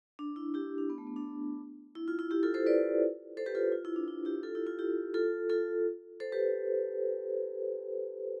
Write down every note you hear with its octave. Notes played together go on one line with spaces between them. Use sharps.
D4
E4
E4 G4
D4
B3
A3
B3
D4
E4
F4
E4
E4 G4
F4 A4
A4 C5
B4 D5
A4 C5
G4 B4
F4 A4
F4
E4
D4
E4
E4 G4
F4 A4
E4 G4
F4
E4 G4
F4 A4
F4 A4
A4 C5
G4 B4